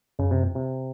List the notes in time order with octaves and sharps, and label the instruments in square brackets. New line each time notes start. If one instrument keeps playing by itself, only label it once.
[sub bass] F#2 [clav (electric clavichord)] C#3
[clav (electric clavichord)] C3
C3